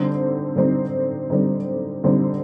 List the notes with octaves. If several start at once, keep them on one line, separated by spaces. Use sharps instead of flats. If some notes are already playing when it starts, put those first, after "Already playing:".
Already playing: D3 G3 C4 D#4
D3 G3 C4 D#4
D3 G3 C4 D#4
D3 G3 C4 D#4